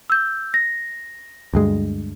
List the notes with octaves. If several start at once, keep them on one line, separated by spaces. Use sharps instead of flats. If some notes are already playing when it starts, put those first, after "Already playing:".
E6 G6
A#6
D2 G2 G#3